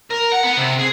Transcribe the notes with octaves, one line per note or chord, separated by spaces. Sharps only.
A#4
F#5
B3
C3
G#4